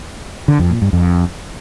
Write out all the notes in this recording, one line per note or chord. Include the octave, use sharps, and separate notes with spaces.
D3
F2
A#2
G2
F2